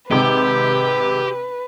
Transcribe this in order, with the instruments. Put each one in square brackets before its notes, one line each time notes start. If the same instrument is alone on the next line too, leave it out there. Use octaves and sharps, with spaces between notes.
[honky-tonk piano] G#1 C3 G#3 [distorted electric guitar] G4 [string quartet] B4